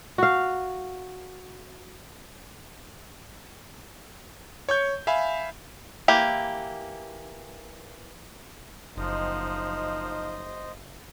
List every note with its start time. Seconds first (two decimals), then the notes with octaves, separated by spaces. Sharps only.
0.18 F#4 F5
4.69 C#5 C#6 G6
5.07 E5 F5 G#5 B5
6.08 E3 A#3 G4
8.97 F#1 F3 D#4 C5 D#5